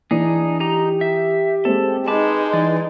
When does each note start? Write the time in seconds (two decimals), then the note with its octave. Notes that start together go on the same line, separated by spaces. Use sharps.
0.11 E3 D4 D#4 G#4
0.60 D#4 G4 A#5
1.01 E5
1.65 G#3 C4 A4
2.08 G#3 D#4 B4 A5 D6
2.53 E3 D5